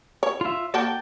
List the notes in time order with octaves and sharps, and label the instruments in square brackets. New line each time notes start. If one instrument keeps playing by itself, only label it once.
[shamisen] C#5
[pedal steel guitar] F4 E5
[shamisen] A#3 F#4 A4 [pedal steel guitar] G5 A5